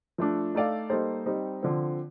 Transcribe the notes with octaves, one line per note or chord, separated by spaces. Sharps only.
F3 A3 D4
A3 D#4 A4 D5 F5
G3 A#3 D#4 A4 C5
G3 C4 D#4
D3 F3 C4